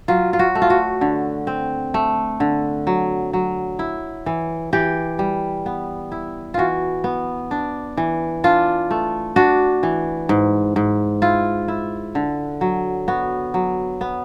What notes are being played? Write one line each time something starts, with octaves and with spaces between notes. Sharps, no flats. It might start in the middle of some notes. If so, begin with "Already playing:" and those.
F#3 F4
F4
F#4
A3
F4
F#4
D3
C4
A3
D3
F#3
F#3
E4
E3
E3 G4
G3
B3
E4
E3 F4 F#4
B3
D4
E3
D4 F4
A3
D4 F#4
E3
G#2
G#2
E4 F4
E4
D3
F#3
B3 F#4
F#3
B3